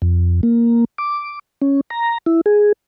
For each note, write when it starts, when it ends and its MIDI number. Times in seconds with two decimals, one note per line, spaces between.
0.02 0.41 41
0.43 0.85 58
0.98 1.39 86
1.62 1.81 61
1.90 2.18 82
2.26 2.41 64
2.46 2.72 68